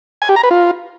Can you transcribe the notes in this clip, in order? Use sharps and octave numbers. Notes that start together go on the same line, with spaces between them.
G#5
G4
A#5
B4
F4